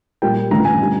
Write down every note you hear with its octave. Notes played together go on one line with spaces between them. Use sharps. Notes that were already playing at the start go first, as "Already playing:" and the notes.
A#2 G3 A#3 G5
A1 G2 D3 F3 A3 A#5
G#5
D3 G3